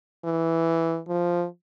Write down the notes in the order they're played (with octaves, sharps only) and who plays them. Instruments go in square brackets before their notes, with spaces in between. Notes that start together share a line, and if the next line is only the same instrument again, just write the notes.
[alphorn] E3
F3